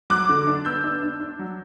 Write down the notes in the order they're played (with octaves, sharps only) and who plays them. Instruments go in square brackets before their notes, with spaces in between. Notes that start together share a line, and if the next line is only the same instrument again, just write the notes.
[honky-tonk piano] F#3 D6 F#6
D3
D4
B3 E6 G6
D4
D4
D4
F#3